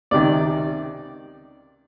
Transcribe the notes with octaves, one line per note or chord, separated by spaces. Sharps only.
C#2 C3 D#3 D5